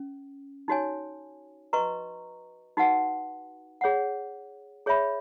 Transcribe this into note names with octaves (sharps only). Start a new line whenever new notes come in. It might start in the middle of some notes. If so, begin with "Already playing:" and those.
Already playing: C#4
D#4 F#4 C#5 G#5
F#4 B4 D#5 A#5 C#6
D#4 F#4 B4 F#5
G#4 C#5 F#5
G#4 C#5 E5 B5